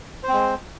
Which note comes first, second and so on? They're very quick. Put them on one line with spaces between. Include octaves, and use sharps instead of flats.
C5 C4 G#3